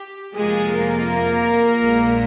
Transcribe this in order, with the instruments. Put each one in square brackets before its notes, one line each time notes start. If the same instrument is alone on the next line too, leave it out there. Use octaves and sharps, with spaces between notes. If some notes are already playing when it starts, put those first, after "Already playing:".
Already playing: [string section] G4
F2 C3 F3 G#3 A#3 F4 G#4
A#3 A#4
A#1 A#2 G#3